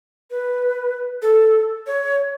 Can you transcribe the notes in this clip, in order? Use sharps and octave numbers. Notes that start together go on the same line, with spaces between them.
B4
A4
C#5